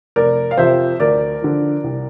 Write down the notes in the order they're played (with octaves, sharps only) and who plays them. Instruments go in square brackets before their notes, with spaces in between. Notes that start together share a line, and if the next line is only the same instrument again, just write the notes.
[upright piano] F1 A#4 D5
F5
F2 C3 F3 C5 E5
D2 A#4 D5
D3 F3
C2